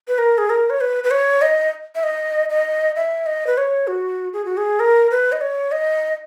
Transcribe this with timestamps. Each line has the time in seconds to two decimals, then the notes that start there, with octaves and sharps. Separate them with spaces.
0.08 B4
0.18 A#4
0.38 G#4
0.50 A#4
0.70 C#5
0.81 B4
1.04 B4
1.11 C#5
1.42 D#5
1.95 E5
2.03 D#5
2.50 D#5
2.96 E5
3.26 D#5
3.47 B4
3.58 C#5
3.87 F#4
4.33 G#4
4.45 F#4
4.57 G#4
4.80 A#4
5.11 B4
5.32 D#5
5.41 C#5
5.72 D#5